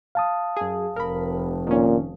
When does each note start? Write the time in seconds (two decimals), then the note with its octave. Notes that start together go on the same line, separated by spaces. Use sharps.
0.15 F5 A5 D#6
0.57 F#2 G#4
0.96 F1 A#4 B5
1.67 A#2 D#3 C#4